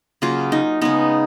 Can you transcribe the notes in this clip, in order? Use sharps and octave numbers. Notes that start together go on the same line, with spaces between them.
C#3 F#3 A#3 F4
D#4
C#3 G#3 B3 D#4